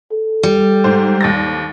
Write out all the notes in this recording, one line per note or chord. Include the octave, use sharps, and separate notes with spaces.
A4
G3
G#2 C5
D#2 A6 A#6